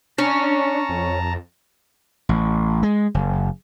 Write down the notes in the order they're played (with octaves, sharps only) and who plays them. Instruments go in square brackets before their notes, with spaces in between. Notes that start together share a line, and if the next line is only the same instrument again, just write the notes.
[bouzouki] C#4 [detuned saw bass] D4 [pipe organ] A5 A#5
[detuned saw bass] F2
[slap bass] A1
G#3
F#1